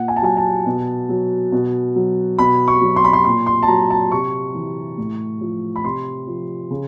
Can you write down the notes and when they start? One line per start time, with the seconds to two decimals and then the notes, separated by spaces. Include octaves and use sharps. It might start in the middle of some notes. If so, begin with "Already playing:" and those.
Already playing: A#2 F#5
0.08 G#5
0.16 A5
0.22 F#3 G#5
0.37 A5
0.66 B2
1.09 F#3
1.52 B2
1.96 F#3
2.39 B2 B5
2.68 C#6
2.82 F#3
2.96 C6
3.04 B5
3.13 C6
3.25 A#2 C6
3.46 C6
3.63 A5
3.68 F#3 A#5
3.90 A5
4.12 C3 C#6
4.54 E3
4.98 A2
5.41 F3
5.76 B5
5.84 C3 C6
6.27 F3
6.71 C#3